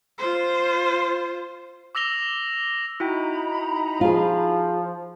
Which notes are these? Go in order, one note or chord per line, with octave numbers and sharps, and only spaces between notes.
F4 C5
D6 E6 A#6 F7 G7
D#4 E4 F#4 G5 A#5 B5
F3 F4 G#4